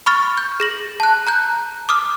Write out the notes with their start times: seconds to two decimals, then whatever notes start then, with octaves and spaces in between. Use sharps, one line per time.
0.06 B5 C#6 F6 A6
0.37 G6
0.60 G#4 A#6 F#7
1.00 A5 F#6
1.27 A#5 F#6 G6
1.89 D6 D#6 F6